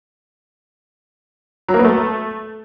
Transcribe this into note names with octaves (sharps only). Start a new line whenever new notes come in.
F#3
A#3
B3
A3